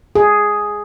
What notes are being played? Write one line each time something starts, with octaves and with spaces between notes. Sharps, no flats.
G#4